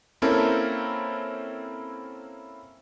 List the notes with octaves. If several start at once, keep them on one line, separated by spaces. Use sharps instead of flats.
A#3 C4 C#4 E4 A4 A#4